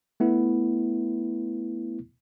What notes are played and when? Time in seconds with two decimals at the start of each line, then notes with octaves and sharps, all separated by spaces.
0.20 A3 B3 E4